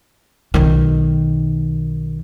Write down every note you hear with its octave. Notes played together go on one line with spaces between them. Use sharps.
B1 D#3